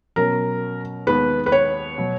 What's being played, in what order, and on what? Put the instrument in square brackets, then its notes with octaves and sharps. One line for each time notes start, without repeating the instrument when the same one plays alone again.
[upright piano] B2 F#3 C#4 [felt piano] A#4
[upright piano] D#2 D#3 G#3 B3 [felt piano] B4
[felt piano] B4
C#5
[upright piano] B2 F#3 B3